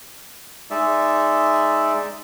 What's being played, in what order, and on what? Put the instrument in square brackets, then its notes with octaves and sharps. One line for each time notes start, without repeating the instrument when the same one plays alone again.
[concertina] G#3 D#4 D5 E5